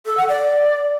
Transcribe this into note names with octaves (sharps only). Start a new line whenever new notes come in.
A4
F#5
D5